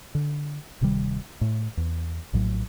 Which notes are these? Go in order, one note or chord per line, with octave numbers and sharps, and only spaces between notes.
D3
D1 C3 D#3 G3
A2
E2
A#1 A2 F#3